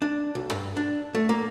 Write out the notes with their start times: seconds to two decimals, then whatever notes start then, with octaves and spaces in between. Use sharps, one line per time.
0.02 D4
0.35 B1
0.51 G2
0.77 D4
1.15 A3
1.29 A#3